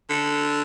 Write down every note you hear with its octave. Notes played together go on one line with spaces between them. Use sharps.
D3